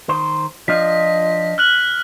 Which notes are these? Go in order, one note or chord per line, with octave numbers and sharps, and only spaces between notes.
D#3 C5
F3 D4 F4 D#5 B6
F6 F#6 F#7